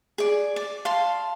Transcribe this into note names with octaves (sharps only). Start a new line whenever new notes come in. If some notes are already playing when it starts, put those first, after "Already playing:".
G#4 D5
D5
F5 A5 C6